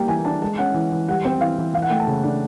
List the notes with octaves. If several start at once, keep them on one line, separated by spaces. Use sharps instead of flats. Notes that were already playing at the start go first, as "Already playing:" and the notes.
Already playing: G3 A#3 G5
E3 G#5
D4 A5
G#3 A5
C#4 F#5
E3
E3
G3 F#5
C4 G5
E3 F5
E3
E3 F5
F#5
A3 G5
A5
C#3
D4